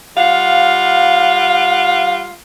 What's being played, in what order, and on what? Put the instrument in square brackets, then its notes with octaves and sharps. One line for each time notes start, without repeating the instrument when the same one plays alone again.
[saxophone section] G3 F4 F5 F#5